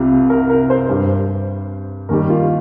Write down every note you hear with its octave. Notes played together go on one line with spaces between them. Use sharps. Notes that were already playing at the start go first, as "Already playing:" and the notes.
Already playing: C2 C3 G3 F4
A#4
A#4
C5
G2 G3 C5
D#2 D#3 G3 A#4
F4